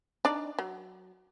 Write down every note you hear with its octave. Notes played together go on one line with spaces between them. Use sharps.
D4 D#4 D5
F#3